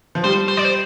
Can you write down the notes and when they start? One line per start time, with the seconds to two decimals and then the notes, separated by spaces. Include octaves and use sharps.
0.15 F3
0.24 G3 C5
0.48 C5
0.57 D5
0.65 C5